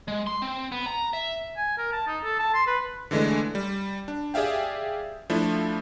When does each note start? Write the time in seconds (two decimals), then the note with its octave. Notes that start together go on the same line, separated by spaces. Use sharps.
0.08 G#3
0.27 C6
0.42 C4
0.72 B3
0.86 A#5
1.13 E5
1.57 G#5
1.78 A#4
1.93 A5
2.07 D#4
2.24 A4
2.39 A5
2.54 C6
2.67 B4
3.11 D3 E3 G#3 A3 D4
3.55 G3
4.08 D4
4.34 G4 G#4 D5 E5 F5 G5
5.30 F3 A3 D4 E4